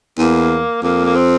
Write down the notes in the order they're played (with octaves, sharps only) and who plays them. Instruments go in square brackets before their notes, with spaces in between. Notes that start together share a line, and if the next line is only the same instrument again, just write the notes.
[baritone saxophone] E2 [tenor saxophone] A#3
[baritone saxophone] F2 [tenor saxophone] A#3
[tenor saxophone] A#3
C4